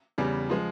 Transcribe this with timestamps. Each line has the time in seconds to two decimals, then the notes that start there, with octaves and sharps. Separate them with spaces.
0.18 E2 C#3 G3
0.50 F3 G#3